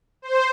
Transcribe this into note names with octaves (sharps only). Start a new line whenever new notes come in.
C5